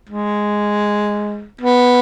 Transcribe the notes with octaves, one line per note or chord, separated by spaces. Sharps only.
G#3
B3